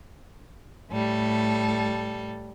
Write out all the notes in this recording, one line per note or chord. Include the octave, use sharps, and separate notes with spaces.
A2 G3 A4